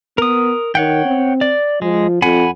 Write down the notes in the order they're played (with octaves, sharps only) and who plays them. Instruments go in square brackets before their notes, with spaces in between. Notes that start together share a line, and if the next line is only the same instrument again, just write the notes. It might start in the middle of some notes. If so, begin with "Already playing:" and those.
[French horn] B3 [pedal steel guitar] A#4 D#6
[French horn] D#3 [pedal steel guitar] C#5 F#5 G5
[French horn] C4
[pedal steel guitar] D5
[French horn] F3 [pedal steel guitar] G#3
[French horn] F2 [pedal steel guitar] F#5 G#5 B5